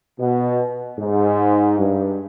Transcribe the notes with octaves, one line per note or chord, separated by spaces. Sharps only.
B2
G#2
G2